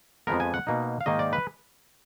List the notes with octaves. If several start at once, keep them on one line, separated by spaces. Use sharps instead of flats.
F2 F3 G#3 B3 A#4
G#5
F#5
B2 A#3 D#4
F5
G#2 D#3 A#3 D#4 D#5
D5
B4